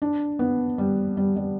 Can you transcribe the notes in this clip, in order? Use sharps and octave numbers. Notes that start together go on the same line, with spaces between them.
D4
B3
G3
G3
G3